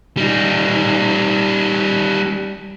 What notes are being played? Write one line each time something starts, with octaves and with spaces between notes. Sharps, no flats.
G3 D#4